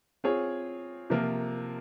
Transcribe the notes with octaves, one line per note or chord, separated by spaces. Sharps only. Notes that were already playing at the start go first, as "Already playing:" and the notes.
C4 F4 G#4 C#5
C3 F3 A#3 F4 A#4